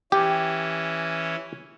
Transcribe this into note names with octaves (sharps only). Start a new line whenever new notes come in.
E3 C#4 G4